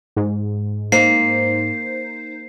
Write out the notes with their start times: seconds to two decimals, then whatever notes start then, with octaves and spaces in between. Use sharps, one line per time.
0.16 G#2
0.92 A#3 D#4 C5 C7